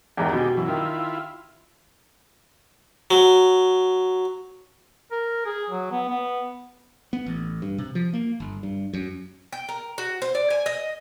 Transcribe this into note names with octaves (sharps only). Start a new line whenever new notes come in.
E2 G#2 D#3 G4 G#4
B2
F#2 E3
D#3 E4 F4
F#3
A#4
G#4
F#3
B3
B3
B3
A1
G2
C3
F3
A#3
G1
G2
F#2
G5
A#4
F#4
C5
D5
G#5
D#5